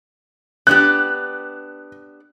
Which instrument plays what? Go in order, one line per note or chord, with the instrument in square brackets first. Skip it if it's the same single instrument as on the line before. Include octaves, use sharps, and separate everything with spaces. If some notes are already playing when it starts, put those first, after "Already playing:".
[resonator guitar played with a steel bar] B3 D4 G4 [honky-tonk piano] F#6